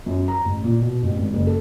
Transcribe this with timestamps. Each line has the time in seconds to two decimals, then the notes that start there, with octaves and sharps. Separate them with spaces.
0.06 F#2
0.28 A#5
0.45 A1
0.64 A#2
0.81 B2
1.03 A1
1.17 G#1
1.33 F#1
1.47 A4